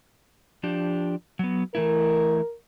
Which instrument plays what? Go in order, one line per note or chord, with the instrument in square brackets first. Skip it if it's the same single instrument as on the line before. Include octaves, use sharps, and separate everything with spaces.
[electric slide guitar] F3 D4 G4
F#3 B3
[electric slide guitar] E3 A3 E4 [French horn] A#4